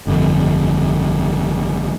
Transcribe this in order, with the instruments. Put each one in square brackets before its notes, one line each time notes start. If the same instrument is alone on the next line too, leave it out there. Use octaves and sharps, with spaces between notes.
[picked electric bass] G1 F2